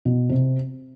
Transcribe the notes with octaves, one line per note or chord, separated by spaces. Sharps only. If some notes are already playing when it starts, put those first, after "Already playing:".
B2
C3